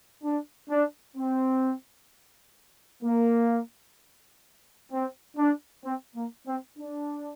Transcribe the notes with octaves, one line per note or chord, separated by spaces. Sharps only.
D4
D4
C4
A#3
C4
D4
C4
A#3
C4
D4